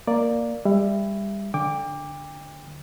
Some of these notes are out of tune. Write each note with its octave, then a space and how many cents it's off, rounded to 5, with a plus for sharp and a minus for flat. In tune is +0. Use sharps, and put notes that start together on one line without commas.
A#3 +0 D5 +0
G3 +30 E5 +20
D3 +0 G5 +35 D6 +0